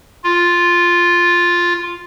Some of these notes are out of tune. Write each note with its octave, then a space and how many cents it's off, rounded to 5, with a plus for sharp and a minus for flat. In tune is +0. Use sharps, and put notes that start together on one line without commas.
F4 +0